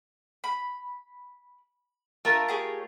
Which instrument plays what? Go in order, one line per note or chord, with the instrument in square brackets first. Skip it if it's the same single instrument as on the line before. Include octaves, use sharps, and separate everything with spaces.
[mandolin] B5
[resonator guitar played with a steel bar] A3 F4 A#4 [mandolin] A5
[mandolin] G4 G#4 C#5